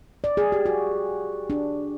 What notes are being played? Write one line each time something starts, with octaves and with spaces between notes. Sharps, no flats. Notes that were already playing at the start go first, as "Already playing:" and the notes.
D5
G#4
G4
F#4
D4